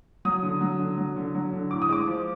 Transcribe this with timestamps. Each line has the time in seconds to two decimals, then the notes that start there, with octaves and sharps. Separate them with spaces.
0.25 F#3 D#6
0.43 D3
0.61 F#3
0.79 D3
0.98 F#3
1.16 D3
1.35 F#3
1.53 D3
1.71 A2 D6
1.82 D#6
1.89 G#3 D6
2.07 F3